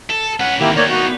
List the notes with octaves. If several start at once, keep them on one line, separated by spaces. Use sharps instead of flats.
A4
C#4 B4 F#5
D#3 A#3 C4 E4 G4
A#3 B3 D#4 C#5 D5
F#4